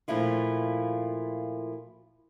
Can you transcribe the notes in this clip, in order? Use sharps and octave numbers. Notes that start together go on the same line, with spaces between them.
A#2 F3 A3 E4 F4